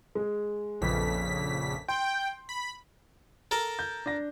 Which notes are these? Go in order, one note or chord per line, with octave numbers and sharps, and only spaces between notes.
G#3 G#4
A#1 F2 C#3 A4 B4 B6
G5 C6
B5
A4 A#4
G6
D4 A#6